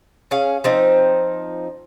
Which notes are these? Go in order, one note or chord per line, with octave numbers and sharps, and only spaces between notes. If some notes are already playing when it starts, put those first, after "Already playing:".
C#4 G#4 F5
F3 C4 D#4